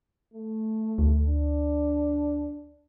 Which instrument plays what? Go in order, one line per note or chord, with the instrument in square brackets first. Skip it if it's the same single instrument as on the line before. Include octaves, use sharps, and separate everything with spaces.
[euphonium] A3
[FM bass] D2
[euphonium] D4